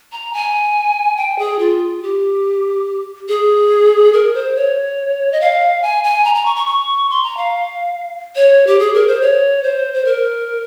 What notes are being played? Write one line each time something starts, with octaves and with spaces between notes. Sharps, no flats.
A#5
G#5
G5
G#4
F4
G4
G#4
A#4
C5
C#5
D#5
F5
G#5
G#5
A#5
A#5
C#6
C#6
C#6
C6
A#5
F5
C#5
G4
G#4
A#4
C5
C#5
C5
C5
A#4